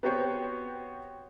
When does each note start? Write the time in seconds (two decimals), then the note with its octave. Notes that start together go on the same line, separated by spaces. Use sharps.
0.03 B3 C4 F#4 G4 C5 C#5